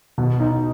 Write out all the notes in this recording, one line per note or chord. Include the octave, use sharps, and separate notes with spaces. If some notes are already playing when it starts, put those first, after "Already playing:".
B2
D#4